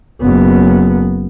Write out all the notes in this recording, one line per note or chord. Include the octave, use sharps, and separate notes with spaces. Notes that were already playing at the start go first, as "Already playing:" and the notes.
F#1 B3